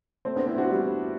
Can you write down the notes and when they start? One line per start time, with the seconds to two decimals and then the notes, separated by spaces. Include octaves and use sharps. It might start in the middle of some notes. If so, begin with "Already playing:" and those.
0.25 A3 C4
0.36 B3 D4
0.47 C4 E4
0.58 D4 F#4
0.70 G3